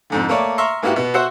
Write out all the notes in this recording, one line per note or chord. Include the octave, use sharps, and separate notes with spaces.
F2 G#2 D3
A3 A#3 A#4 C#5 D5
E5 A#5 C6 C#6 F6
G#2 A#3 B3 E4 F#4 G4
B2 B3
F#4 C5 E5 F#5